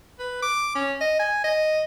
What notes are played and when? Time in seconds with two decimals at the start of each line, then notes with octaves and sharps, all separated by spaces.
0.19 B4
0.42 D6
0.75 C#4
1.01 D#5
1.20 G#5
1.44 D#5